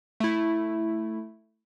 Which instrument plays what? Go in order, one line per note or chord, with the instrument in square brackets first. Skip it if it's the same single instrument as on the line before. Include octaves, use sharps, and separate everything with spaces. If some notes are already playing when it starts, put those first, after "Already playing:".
[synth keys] A3 E4